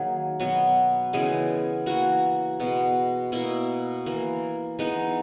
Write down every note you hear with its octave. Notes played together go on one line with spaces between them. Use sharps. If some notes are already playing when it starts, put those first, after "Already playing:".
Already playing: D#3 F#3 A#3 G#4
B2 F#3 B3
C#3 E3 G#3 B3 G#4
E3 A#3 F#4
B2 G#3 B3
B2 A#3 E4
E3 A#3
E3 G#3 B3 D#4